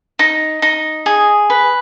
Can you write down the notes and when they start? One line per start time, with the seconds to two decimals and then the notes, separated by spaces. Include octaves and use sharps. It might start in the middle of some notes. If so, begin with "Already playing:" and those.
0.19 D#4
0.62 D#4
1.06 G#4
1.50 B4